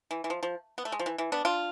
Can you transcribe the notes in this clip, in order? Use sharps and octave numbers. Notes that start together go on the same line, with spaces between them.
E3
E3
F3
F3
B3
A3
G#3
F3
E3
E3
B3 D4
D4 F4